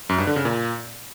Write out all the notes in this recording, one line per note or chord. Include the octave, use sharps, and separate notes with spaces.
F#2
G2
D3
C#3
A#2